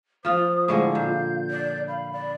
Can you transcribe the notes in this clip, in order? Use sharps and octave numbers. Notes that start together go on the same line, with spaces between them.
F3 F4 C5 D#6
A2 D3 G#3 F5
A#2 G6
D5
F5 B5
D5